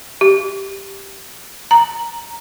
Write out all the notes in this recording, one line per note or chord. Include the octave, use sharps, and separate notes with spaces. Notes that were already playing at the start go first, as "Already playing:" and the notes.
G4
A#5